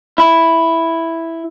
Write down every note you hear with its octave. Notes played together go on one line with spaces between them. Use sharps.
E4